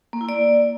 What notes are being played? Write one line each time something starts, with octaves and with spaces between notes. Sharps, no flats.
A#3
E4
D5